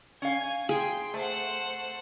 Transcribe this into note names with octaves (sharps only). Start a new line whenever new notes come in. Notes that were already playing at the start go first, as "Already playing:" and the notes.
C#4 F5 G#5
G#4 G5 C6
A3 C5 F#5